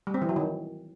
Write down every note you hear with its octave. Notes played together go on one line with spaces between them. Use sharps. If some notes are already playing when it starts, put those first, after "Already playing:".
G3
C4
E3
F#3
D#3